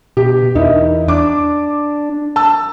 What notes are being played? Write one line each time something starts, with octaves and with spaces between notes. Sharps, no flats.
B2 G4
E2 D#4 E4 A#4
D4 D6
A5 E6